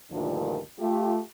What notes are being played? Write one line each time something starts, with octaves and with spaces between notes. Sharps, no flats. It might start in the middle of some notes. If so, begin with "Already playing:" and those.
D2 G2 A#2 D#3 F3 D4
A3 F4 G4